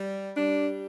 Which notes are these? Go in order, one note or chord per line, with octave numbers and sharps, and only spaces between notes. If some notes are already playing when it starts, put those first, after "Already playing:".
Already playing: G3
G3 D4